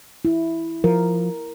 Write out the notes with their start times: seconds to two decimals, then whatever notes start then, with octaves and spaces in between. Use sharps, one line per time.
0.25 E4
0.84 F3 A#4